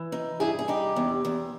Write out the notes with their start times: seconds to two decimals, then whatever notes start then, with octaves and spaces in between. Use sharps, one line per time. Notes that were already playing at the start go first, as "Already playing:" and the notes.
Already playing: E3
0.12 D#4
0.40 G2 E4 G#4
0.59 G#4
0.68 G2 D#4 G4
0.96 E2
1.25 E2